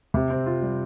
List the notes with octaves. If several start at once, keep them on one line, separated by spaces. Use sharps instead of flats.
C3
C4
F4
G3